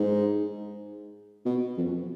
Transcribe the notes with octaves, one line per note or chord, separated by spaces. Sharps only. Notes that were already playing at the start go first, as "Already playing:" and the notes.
Already playing: G#2
B2
F2